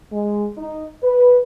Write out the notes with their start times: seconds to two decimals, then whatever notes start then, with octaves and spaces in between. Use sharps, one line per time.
0.12 G#3
0.58 D#4
1.03 B4